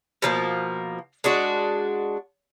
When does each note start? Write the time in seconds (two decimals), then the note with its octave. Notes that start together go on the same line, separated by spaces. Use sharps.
0.22 B2 F3 A#3
1.24 G#3 D4 F#4